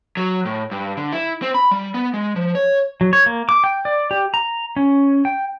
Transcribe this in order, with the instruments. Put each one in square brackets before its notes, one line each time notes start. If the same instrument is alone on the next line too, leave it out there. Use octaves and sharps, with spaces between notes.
[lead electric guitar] F#3
A2
G2
D3
E4
C4
B5
G3
B3
G#3
F3
C#5
[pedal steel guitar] F#3
C#5
A#3
D6
G5
D5
G4
A#5
C#4
G5